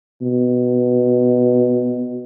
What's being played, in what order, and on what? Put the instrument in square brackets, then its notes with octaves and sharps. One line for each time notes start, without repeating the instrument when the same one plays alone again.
[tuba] B2